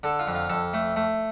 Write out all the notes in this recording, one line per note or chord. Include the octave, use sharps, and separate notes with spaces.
D3 A4
F4
F2
F4
F2 A4
A3
A3